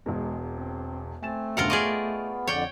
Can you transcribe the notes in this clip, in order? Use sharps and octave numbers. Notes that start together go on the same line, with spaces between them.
E1 E2 G#3
C4
A3 C4 G#5 A6 E7
E1 G2 C#3 F4 A#4 F#5
B3 G#4 D5 D#5 C6 C#6 F6
F2 D3 C#5 D5 G5